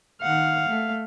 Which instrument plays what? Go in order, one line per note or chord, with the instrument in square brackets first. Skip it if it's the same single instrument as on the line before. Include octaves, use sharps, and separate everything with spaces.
[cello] D#3 F#5 [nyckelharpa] F5
[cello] A3